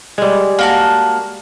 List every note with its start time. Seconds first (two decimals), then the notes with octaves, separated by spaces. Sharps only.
0.18 G3 G#3
0.59 A#3 F#4 A5